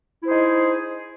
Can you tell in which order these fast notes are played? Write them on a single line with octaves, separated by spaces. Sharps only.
E4 C5 G#4 D#4